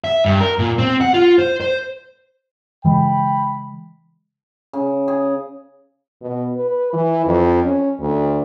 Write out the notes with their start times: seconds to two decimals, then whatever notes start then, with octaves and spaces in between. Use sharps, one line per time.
0.04 E5
0.25 G2
0.40 A#4
0.59 A#2
0.78 C4
1.01 F#5
1.14 F4
1.39 C5
1.60 C5
2.85 C#3 E3 G#3 G5 B5
4.73 C#3
5.08 G#4
6.21 B2
6.57 B4
6.93 E3
7.26 F2
7.64 C#4
8.00 D2